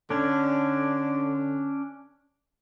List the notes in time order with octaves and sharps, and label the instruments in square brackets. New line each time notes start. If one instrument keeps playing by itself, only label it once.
[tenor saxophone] D3 [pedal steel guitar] C#4 D4